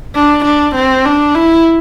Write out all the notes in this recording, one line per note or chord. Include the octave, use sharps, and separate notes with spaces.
D4
D4
C4
D4
E4